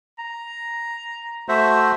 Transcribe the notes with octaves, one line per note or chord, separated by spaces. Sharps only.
A#5
A3 F#4 C5 E5